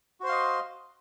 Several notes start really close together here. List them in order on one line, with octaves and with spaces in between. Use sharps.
F#4 C5 C6 F5 D#5